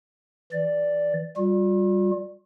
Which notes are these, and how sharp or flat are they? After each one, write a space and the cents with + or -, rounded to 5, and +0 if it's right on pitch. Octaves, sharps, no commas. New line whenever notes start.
E3 +0 D5 +0
G3 +0 F4 +45